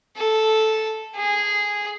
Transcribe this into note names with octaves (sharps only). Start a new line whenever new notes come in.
A4
G#4